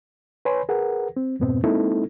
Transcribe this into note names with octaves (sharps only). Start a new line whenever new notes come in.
B4 C#5 G#5 B5 C6
G#4 A#4 B4 F#5
C4
F2 G#2 B2 B3 C4
G#3 A#3 C4 D#4 E4 A4